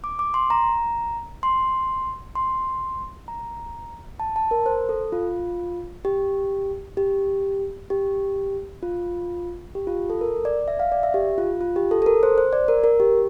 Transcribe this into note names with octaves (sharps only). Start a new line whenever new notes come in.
D6
D6
C6
A#5
C6
C6
A#5
A5
A5
A#4
C5
A4
F4
G4
G4
G4
F4
G4
F4
A4
A#4
D5
E5
F5
D5
E5
G4
F4
F4
G4
A4
A4
A#4
C5
C5
D5
A#4
A#4
G4